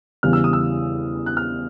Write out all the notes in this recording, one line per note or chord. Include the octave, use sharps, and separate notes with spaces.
E2 C#3 E3 G3 F6
E6
D#6
E6
F#6
F6